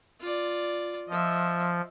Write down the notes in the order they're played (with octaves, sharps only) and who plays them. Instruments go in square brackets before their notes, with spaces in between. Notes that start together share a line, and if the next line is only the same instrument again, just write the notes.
[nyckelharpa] F4 D5
[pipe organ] F3 [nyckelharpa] D#5 E5